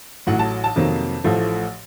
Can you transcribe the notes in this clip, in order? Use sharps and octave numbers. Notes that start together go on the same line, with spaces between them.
A1 A2 F#3 F#5
A5
A5
F2 C3 D#3 F#3 A#3
A1 A2 F3 A3